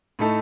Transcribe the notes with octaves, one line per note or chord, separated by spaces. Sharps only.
A2 A3 D#4 A4